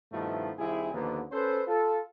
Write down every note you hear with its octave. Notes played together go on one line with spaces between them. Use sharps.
G2 B2 D#3 F3 A3 E4
C2 D#3 C4 E4 G#4
D#2 B2 D3 F3 A#3 B3
C#4 A4 B4 C5
F4 A4